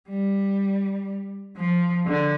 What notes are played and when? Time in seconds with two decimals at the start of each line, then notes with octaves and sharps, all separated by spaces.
0.09 G3
1.57 F3
2.06 D3